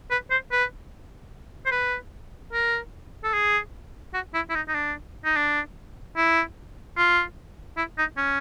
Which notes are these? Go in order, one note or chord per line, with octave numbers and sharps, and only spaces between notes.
B4
C5
B4
C5
B4
A#4
A4
G#4
F#4
E4
E4
D#4
D#4
D4
D#4
D4
E4
F4
E4
D#4
C#4